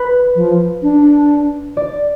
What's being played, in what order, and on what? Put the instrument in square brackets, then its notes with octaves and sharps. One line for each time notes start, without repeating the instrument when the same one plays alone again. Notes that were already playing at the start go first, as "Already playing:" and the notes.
Already playing: [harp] B4
[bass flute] F3
D4
[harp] D5